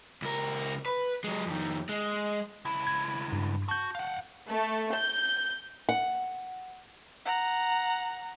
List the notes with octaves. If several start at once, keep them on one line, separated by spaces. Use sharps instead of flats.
C#2 A#4
B4
F#3 G#3
F2 D#3
G#3
C#2 E4
G#6
G2
F#4 A5 G6
F5 F#5
A3
G6
F#5
F#5 A#5